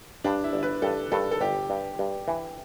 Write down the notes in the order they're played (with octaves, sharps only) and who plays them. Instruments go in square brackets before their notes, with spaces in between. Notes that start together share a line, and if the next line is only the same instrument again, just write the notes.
[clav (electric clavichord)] G2 [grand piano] D4
[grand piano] E4
[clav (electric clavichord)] G1
[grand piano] B4
[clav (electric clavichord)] G2 [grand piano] A4
[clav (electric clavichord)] G2 [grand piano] A4
[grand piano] A4
[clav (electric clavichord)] G1 [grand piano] G4
[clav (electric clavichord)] G2
G2
E3